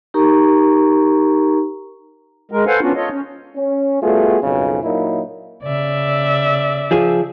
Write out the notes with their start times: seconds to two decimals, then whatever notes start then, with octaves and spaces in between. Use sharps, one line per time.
0.14 D#4 G4 A#4 A#5 C#6
2.51 G#3 A#4
2.67 A4 B4 C5 F5 F#5 G#5
2.81 B3 C#4 D4 F4 F#4
2.96 F4 A4 C#5 D#5
3.09 C#4
3.56 C#4
4.02 G3 A3 B3 F4 F#4 G#4
4.43 B1 F2 C#3
4.83 A#2 F#3 A#3 D#4 E4
5.63 C#3 D5 E5
6.91 F3 G#4